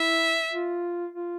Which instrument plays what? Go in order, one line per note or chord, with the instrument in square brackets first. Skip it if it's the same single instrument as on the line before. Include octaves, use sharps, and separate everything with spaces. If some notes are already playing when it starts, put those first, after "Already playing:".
Already playing: [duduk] E4 [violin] E5
[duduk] F4
F4